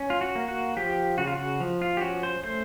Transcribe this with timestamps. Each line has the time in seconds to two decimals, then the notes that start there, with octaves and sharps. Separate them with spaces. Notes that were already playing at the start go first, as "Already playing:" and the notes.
Already playing: C#4
0.10 F4
0.21 F#4
0.35 A#3
0.48 F#4
0.77 F3 G4
1.18 C#3 F#4
1.27 F4
1.36 F#4
1.60 F3
1.82 F4
1.97 G4
2.01 C#4 F#4
2.23 C5
2.44 A3 C5